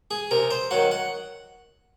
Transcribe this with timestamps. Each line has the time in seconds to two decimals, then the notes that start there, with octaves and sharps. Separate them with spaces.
0.11 G#4
0.31 C3 A#4
0.51 C5
0.71 D#3 F#3 F#5
0.91 F#5